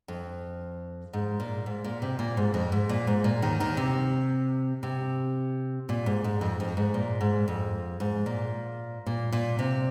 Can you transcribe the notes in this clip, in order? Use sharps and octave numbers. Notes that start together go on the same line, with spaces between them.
F2
G#2
A#2
G#2
A#2
C3
A#2
G#2
F2
G#2
A#2
G#2
A#2
D#2 D#3
D#2 D#3
C3
C3
A#2
G#2
G#2
F2
F2
G#2
A#2
G#2
F2
G#2
A#2
A#2
A#2
C3